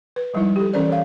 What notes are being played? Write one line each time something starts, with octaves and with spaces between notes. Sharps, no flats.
B4
F3 G3 G#3 D#4 E4
G4 A4
E3 C#4 A4 A#4 C5 D5
C#5 F5